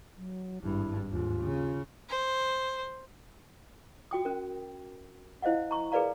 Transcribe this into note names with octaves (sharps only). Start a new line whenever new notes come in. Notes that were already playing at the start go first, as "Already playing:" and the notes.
F#3
G#1 G2 E4
D#2 G#2 F4
C#3
C5
F#4 G5 D#6
C#4 A#4
E4 C5 D#5 F5 F#5
A#5 C#6
G#4 A#4 B4 D5 F5 A#5